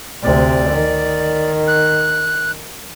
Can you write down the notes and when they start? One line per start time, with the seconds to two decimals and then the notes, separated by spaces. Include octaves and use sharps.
0.22 D2 C3 D5
0.69 D#3
1.68 F#6